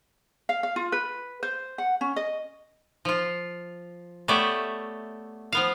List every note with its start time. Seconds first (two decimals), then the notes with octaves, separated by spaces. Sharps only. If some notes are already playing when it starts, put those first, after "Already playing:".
0.49 F5
0.63 F5
0.76 F4
0.92 B4
1.43 C5
1.78 F#5
2.01 C#4
2.16 D#5
3.05 F3 F4
4.28 A3 B3 G4 C#5 D5 E5
5.52 F3 B3 F5